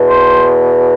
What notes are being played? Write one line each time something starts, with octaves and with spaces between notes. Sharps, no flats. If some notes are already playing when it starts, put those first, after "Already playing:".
Already playing: E2 B2
C5